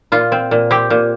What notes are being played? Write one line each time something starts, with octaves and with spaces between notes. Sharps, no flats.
A#2 F4
C4
A#2
C4 G4
A#2